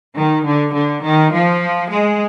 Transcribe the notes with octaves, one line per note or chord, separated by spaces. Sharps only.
D#3
D3
D3
D#3
F3
G#3